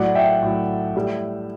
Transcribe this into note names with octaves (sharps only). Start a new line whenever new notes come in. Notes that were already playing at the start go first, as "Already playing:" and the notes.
Already playing: A2 F#3 D5 F#5
E5 G5
A2 F#3
A2 G3